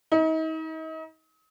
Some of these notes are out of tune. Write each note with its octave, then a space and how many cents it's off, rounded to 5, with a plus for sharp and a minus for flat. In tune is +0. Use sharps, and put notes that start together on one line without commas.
D#4 +40